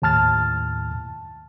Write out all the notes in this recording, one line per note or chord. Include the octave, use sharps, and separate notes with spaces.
D#2 A2 A5 F6 A6